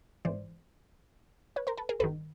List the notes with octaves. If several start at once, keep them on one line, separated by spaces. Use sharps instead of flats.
G#1 G#2 E3 C5 D5
B4 C#5
A#4 C5
A4 B4
G#4 A#4
G1 G2 D#3 A4 B4